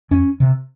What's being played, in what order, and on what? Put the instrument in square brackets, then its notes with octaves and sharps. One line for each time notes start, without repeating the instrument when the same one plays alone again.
[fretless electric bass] F2 C#4
C3